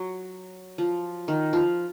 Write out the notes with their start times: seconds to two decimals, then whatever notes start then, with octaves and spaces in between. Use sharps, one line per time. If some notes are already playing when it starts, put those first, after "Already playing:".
Already playing: F#3
0.78 F3
1.28 D#3
1.53 F3